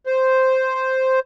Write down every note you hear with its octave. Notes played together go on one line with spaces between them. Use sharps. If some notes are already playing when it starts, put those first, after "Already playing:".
C5